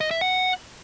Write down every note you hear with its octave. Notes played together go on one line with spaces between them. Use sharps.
D#5
E5
F#5